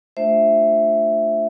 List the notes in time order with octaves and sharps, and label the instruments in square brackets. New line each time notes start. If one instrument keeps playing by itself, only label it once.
[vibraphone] A3 D4 F4 C5 E5